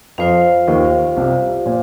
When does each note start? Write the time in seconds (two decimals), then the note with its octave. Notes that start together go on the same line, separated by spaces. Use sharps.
0.18 F2 F3 F4 C5 F5
0.67 D#2 D#3
1.17 C2 C3
1.66 A#2